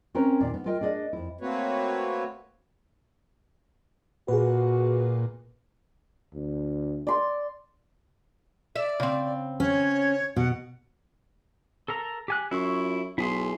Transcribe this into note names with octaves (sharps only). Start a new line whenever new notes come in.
C4 C#4 A#4 B4 C#5
D#2 A#2 D#3 D4 D5
B3
F4 A#4 D#5 G5
D4 G#4 D5 D#5
F2 E4
A3 A#3 C4 F#4 B4 C#5
A#2 F#4 G#4 B4
D2
D5 C6
D5 E5
C#3 C4
C#4 C#5
B2 F#5
A4 A#4 A#5
G4 G#5 F#6
F#2 E4 F4 C#6
B1 E4 G#4 C6